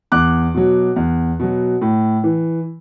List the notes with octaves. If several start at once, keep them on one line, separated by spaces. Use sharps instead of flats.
E2 D6 F#6
B2 F#3
E2
B2 F#3
A2
E3